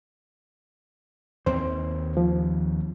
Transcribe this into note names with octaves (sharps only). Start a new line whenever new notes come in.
D#2 C4 C5
F3